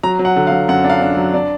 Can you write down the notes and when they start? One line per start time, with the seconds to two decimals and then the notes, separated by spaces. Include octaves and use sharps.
0.03 F#3 A#5
0.19 F#3
0.25 F#5
0.36 D3
0.47 F5
0.52 F#3
0.68 F#2 F#5
0.84 D4
0.90 F5
1.02 D4
1.17 F#3
1.34 D4 D5